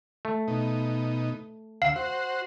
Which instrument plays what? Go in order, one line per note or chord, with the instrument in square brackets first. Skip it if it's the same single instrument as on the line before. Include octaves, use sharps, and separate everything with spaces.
[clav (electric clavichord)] A3
[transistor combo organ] B2 D#4
[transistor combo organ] D2 E6 [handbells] F5
[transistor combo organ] F#4 C5